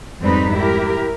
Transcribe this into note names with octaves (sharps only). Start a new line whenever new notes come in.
F2 G#2 G3 C4 D#4 B4
E4 G4 A#4